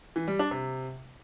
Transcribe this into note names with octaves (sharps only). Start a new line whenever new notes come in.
E3
G3
D4
C3